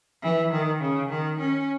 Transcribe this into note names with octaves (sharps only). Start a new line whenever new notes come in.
E3
D#3
C#3
D#3
C#4